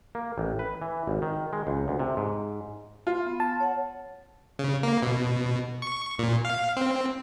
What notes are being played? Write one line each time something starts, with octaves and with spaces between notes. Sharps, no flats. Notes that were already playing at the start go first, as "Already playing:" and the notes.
A#3
A1
B4
E3
G#1
D#3
G#3
C#2
D2
C3
G#2
F4
B3
A5
C#5 F#5
C#3
A#3
B2
C#6
A#2
F5
C4